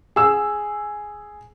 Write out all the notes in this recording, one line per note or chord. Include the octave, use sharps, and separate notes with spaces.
G#4 E6